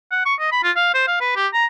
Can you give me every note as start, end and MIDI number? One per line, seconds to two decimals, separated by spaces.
0.11 0.21 78
0.25 0.34 85
0.40 0.51 75
0.52 0.62 83
0.63 0.71 65
0.76 0.89 77
0.94 1.06 72
1.07 1.16 77
1.21 1.35 71
1.36 1.47 67
1.53 1.66 82